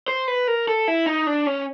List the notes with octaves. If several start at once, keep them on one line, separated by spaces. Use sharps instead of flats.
C5
B4
A#4
A4
E4
D#4
D4
C#4